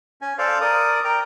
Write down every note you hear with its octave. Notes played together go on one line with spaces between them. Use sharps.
C#4 G#5
A4 C5 D5 F5
A#4 D5 D#6
A#4 G5 A#5